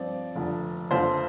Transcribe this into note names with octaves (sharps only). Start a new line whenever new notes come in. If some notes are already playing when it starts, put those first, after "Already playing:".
Already playing: G2 F3 C4 D5
F1 F2 D3
F1 F2 D3 F3 C5